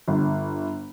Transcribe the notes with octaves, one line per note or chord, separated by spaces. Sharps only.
G1